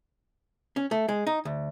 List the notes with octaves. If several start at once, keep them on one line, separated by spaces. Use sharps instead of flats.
C#4
A3
G#3
D#4
D2